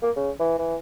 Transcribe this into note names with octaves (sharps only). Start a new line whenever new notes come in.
A#3
C#3
E3
E3